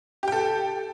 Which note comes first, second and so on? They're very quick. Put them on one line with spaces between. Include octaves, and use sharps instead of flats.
G4 G5 A4